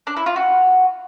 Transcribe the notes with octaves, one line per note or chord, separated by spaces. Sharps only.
D4
E4
F4
F#4